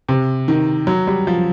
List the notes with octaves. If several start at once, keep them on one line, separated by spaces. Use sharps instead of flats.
C3
D#3
F#3
G3
F3